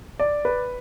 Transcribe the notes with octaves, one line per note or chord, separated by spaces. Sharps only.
D5
B4